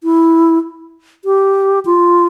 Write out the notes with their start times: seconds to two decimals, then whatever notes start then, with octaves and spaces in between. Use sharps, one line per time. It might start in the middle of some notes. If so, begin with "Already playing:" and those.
0.04 E4
1.25 G4
1.85 F4